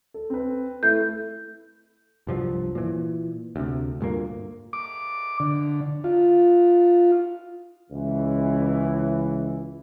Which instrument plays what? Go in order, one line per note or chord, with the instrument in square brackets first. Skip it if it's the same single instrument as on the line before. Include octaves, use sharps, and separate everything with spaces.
[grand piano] A4
C4 B4
[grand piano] A3 E4 [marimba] G6
[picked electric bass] C2 G2 F3 F#3
A#2 E3
D2 C3
D2 G2 A#2 A#3
[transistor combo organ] D6
D3
F4
[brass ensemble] C#2 E3